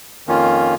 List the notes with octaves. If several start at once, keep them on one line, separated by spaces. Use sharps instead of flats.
F2 D#3 A#3 C#4 F4